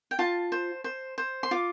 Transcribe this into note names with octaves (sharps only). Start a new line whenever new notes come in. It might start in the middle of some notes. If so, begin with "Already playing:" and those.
G5
F4 A5
C5
C5
C5
C6
F4 D6